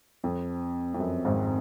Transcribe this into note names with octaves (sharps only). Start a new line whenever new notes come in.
F2
F2
F#2
G#1 G#2